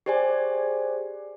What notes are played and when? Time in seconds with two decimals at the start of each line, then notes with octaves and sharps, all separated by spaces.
0.06 G4 G#4 C5 D5 G#5